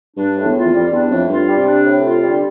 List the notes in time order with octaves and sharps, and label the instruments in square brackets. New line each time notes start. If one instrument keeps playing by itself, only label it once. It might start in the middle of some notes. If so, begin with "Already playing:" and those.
[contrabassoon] G2 [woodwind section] D4
[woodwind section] A2
[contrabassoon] E2
[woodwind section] F4
[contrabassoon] E2
[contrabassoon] F2 [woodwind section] G3
[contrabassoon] E2 [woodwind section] D4
[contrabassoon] F2 [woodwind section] A2
[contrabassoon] G2 [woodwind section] F4
[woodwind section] G3
[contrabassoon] C3
[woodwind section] D4
A2
F4
G3
[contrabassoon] D3